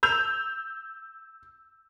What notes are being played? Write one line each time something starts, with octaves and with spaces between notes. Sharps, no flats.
E6 G6 F7